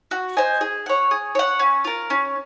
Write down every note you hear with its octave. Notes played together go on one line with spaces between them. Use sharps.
F#4
C5 D#5 G#5
G#4
C#5 F#5
G#4
C#5 F#5
C#4
F4 A#4
C#4